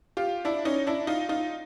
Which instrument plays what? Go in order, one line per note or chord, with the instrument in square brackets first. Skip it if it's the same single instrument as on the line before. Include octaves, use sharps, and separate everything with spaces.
[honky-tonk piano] F4 G4
D4 E4
C#4 D#4
D4 E4
D#4 F4
D#4 F4